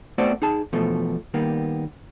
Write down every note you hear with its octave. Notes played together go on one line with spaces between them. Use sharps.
A3 B3 C4 F#4 C5 D5
D#4 G#4 A5
E2 B2 F3 A3
D#3 G3 A#3 B3